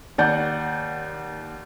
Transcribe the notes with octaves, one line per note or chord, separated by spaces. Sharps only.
D#2 D5 F#5 G6